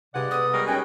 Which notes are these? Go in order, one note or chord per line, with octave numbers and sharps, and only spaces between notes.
G2 C3 G#3 D5 F#5
B3 A4 D#6
B2 G3 G#3 A#4
D#2 C#4 F#4 G5 G#5